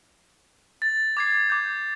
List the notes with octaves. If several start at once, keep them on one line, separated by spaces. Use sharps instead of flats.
A6
D6 G#6 C7
D6 G6